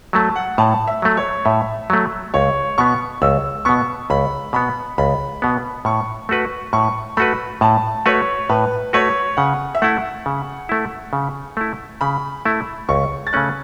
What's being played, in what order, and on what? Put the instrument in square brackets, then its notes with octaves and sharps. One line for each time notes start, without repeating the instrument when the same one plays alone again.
[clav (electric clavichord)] F#3 A3 [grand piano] A5
[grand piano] F#5
[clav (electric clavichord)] A2 [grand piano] A5
[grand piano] E5
[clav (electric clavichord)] F#3 A3
[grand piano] C#5
[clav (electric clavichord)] A2 [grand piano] E5
[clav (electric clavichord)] F#3 A3
[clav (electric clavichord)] C#2 [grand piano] C#5
[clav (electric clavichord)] B2 B3 [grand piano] C#6
[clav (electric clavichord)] C#2 [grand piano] E6
[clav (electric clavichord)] B2 B3 [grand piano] C#6
[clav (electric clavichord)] C#2 [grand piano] B5
[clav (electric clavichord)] B2 B3 [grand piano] B5
[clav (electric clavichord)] C#2 [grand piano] B5
[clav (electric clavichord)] B2 B3
[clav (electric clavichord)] A2 [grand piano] C#6
[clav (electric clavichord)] A3 F#4 B4
[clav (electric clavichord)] A2 [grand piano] C#6
[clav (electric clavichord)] A3 F#4 B4 [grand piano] B5
[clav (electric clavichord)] A2 [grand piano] A5
[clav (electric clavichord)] A3 F#4 B4 [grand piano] C#5
[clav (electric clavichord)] A2 [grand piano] B4
[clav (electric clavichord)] A3 F#4 B4 [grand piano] C#5
[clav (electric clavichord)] C#3 [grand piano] F#5
[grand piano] E5
[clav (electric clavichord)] A3 E4 [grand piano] F#5
[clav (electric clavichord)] C#3
A3 E4
C#3
A3 E4
[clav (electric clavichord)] C#3 [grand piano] B5
[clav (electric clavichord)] A3 E4
[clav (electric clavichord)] C#2 [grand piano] C#6
[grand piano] A6
[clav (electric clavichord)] C#3 A3 C#4 [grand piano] F#6